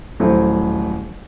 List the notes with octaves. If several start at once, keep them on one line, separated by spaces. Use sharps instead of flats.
D#1 F#3 A3 E4 A4 C5